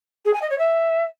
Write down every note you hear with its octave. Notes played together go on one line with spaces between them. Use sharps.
G#4
G#5
D#5
C#5
E5